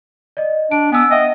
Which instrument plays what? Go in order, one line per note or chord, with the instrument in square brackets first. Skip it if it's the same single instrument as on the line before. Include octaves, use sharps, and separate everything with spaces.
[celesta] D5 D#5
[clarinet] D4 [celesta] D7
[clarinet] B3 [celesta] G#5 E6
[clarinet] D#5 [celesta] E5 F#5 G5